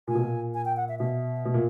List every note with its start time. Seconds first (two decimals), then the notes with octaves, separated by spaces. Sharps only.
0.08 A#2 G#5
0.15 B2
0.23 A#2
0.54 G#5
0.65 G5
0.77 F#5
0.89 E5
0.99 B2 E5
1.45 B2
1.54 A#2